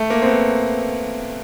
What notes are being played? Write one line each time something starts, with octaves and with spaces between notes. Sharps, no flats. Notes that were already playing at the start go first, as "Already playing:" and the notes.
Already playing: A3
A#3
C4
B3